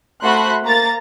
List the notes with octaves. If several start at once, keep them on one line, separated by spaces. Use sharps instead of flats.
A3 F#4 C5 B5 C6 F#6
A#3 A#5 A6